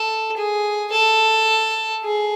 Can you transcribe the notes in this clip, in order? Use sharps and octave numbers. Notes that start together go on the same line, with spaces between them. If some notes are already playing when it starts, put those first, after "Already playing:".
Already playing: A4
G#4
A4
G#4